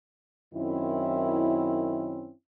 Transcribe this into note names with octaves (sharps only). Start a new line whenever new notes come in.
F#2 D#3 C4 C#4 E4